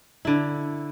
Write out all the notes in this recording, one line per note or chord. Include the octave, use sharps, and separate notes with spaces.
D3 E4